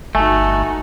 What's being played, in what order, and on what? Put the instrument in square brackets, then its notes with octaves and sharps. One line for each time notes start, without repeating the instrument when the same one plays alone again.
[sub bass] G1 [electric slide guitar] A3 [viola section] D#4 F#4 [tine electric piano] G#5